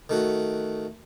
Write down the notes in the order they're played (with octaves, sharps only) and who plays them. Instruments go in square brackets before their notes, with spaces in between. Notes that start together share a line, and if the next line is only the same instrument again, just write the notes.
[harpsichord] D#3 A3 F#4